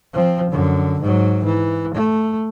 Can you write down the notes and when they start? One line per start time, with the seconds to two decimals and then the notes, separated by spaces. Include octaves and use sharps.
0.13 F3 C4
0.50 F#2 D3
1.01 G#2 F#3
1.45 E3
1.94 A3